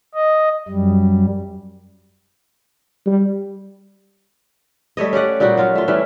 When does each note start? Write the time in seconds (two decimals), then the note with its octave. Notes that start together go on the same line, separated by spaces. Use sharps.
0.15 D#5
0.68 F#2 G3
3.06 G3
4.97 G3 A3 C#5 D#5
5.13 C#4 G4 D5 F#5
5.40 A#2 G3 D#4 F#4
5.57 F#3 F4 F5
5.75 A3 F4
5.88 E3 G3 A3 C#4